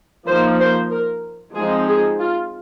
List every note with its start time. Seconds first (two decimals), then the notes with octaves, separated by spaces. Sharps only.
0.26 F3 A#3 D#4 C5
0.59 C5
0.91 A#4
1.55 F3 G#3 C4 D#4 G#4
1.88 G#4
2.20 F4